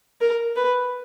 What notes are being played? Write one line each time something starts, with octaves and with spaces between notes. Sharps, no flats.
A#4
B4